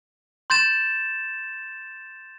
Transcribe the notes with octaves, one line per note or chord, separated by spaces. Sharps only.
C6 G6 A6 E7